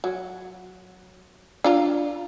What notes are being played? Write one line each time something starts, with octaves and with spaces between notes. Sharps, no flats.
F#3
D4 F4 A#5